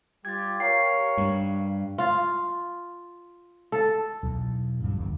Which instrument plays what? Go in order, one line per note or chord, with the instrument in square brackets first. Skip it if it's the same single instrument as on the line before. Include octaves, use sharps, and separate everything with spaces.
[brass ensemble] G3 F4 G4 [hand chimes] G#6 A6
[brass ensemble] G4 A#4 C#5 [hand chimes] F5 G5 C7
[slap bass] G2
[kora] F4
A4
[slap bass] B1 E2
G2 E3 F3
G1 E2 D3 G3